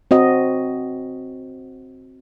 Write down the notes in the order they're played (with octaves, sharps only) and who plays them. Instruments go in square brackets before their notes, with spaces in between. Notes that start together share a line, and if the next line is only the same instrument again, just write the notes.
[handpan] C4 F#4 D#5